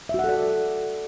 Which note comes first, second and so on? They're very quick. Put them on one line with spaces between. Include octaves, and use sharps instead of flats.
E5 F#4 F#5 A4 D5